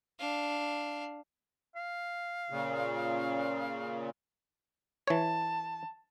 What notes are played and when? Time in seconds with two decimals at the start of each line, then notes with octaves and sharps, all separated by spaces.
0.19 D4 F5
1.75 F5
2.50 A#2 C#3
5.07 E3 C#5 A5